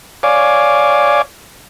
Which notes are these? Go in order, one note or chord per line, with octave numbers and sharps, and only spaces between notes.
C#5 D5 F5 G#5 D6